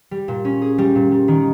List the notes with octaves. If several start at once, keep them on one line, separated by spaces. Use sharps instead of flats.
G3
A#2
C#4
G#4
G3
A#2
G3
D#3